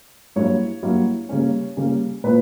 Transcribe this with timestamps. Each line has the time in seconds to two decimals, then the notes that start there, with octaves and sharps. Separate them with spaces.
0.36 G2 F#3 A#3 E4 C#5
0.83 G2 F#3 A#3 E4
1.29 C#3 G3 A#3 C#4
1.77 C#3 G3 A#3 C#4
2.24 A#2 A#3 E4 B4